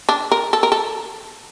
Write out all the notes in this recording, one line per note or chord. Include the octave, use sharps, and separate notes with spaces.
D4
A#4
A4
A#4
A4